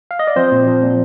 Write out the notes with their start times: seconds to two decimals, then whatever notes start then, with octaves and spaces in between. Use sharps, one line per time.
0.11 F5
0.19 D#5
0.27 D5
0.36 F3 C4 C5
0.52 A#2
0.67 F3
0.83 A#2